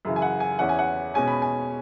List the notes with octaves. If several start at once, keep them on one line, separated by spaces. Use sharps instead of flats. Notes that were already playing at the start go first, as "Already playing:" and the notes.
F#2 C#3 E3
G#5
F#5
G#5
E2 E3 C#4 F#5
G#5
F#5
B2 G#3 C#4 G#5
B5
G#5